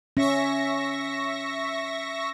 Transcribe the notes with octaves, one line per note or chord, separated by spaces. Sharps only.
C#4 E5 C#6 A#6